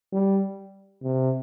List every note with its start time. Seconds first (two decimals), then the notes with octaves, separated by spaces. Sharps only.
0.12 G3
1.03 C3